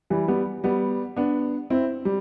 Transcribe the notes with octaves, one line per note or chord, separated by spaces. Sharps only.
E3 G3
G3 B3
G3 B3
B3 D4
C4 E4
G3